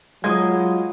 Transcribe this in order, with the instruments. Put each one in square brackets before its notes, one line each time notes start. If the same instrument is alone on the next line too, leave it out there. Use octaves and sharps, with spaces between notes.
[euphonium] F#3 [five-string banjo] G#3 [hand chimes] F4 F5 [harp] D#6 G#6